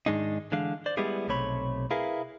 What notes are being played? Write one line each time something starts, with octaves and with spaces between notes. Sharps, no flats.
G#2 D#3 G#3 D4 D#4
D3 E3 G#3 D4 F5
C5 D5
G3 G#3 B3 E4 G4 G#4
B1 C3 A3 C#5 B5
E4 G#4 A#4 B4 F5